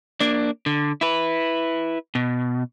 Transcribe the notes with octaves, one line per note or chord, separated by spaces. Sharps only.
A#3 D4
D3
E4 B4
B2